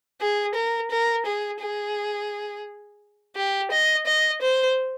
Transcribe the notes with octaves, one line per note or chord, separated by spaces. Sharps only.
G#4
A#4
A#4
G#4
G#4
G4
D#5
D#5
C5